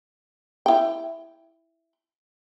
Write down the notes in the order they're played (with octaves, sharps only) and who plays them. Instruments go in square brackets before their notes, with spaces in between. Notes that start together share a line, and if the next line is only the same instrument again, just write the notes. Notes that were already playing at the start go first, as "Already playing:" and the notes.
[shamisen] E4 G5